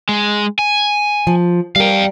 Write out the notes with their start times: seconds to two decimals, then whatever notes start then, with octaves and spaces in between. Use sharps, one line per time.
0.09 G#3
0.59 G#5
1.27 F3
1.76 G3 A#4 F5 G5